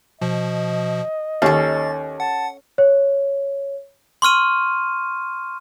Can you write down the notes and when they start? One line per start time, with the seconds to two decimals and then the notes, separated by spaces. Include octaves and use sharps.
0.21 B2 F3 D#5
1.42 D#2 C#4 A4 A6
2.20 F#5 A5
2.78 C#5
4.22 C6 C#6 F6 D#7